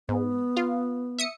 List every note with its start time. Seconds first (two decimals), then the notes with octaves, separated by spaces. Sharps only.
0.09 G#2 B3
0.57 F4 F5
1.18 E5 D#6 C#7